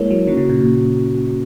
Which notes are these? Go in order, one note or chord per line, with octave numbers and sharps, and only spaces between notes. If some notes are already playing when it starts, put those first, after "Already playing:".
Already playing: G#3 A#3 E4 A#4 C#5
F#3
D#3 A#3 C#4 F#4
C#3
A#2
A#2